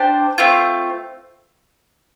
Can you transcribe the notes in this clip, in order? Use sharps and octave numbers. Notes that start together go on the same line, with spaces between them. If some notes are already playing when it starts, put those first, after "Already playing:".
Already playing: D4 G4 C5 A5
A3 C4 F4